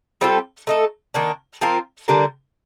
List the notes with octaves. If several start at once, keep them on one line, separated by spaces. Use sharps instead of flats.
G3 C4 F4 A4
A3 D#4 A4
D#3 A#3 D4
F3 C4 F4 A#4
D3 G3 A#3 D4